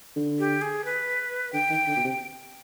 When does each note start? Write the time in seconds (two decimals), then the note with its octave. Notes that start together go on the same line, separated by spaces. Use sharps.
0.16 D3
0.39 G4
0.61 G#4
0.85 B4
1.53 D3 G5
1.70 D#3
1.87 D3
1.97 B2
2.04 C3